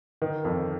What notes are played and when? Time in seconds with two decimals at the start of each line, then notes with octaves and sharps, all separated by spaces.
0.22 D#3
0.44 F2